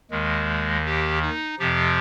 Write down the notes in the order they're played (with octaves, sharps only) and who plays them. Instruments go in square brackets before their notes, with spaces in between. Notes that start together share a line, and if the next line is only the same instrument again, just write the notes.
[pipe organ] D#2 D#3 G#3
G4
D#4
F2 C3 F3 G4